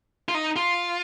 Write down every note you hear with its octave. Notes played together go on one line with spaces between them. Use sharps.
F4
D#4
F4